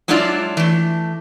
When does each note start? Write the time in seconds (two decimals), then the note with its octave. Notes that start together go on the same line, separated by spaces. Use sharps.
0.08 F#3 G#3 D4 E4 F4 D5
0.57 E3 A3